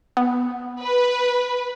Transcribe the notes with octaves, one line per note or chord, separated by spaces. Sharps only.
B3
B4